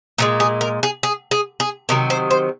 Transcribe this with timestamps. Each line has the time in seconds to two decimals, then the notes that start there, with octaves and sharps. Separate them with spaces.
0.18 A#2 F3 G#3 F4
0.40 G#4
0.61 A#4
0.83 G#4
1.03 G#4
1.31 G#4
1.60 G#4
1.89 C3 D#3 F#3 A#4
2.10 C5
2.31 C5